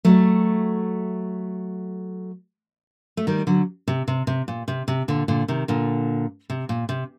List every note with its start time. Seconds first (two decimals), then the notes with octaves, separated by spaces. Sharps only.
0.05 F#3 A3
3.17 A3
3.27 D#3 G3
3.47 D3 F#3
3.88 C3
4.08 C3
4.27 C3
4.48 A#2
4.68 C3
4.88 C3
5.08 A#2 D3
5.28 A#2 D3
5.48 C3 D#3
5.68 A#2 D3
6.50 C3
6.69 A#2
6.89 C3